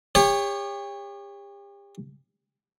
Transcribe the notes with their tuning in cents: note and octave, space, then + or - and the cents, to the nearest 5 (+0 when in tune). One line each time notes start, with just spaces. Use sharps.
G4 +40 C#5 +0